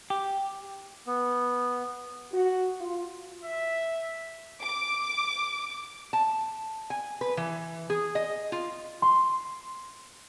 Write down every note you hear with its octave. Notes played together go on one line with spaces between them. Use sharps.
G4
B3
F#4
F4
E5
D6
A5
G#5
B4
E3
G#4
D#5
F4
C6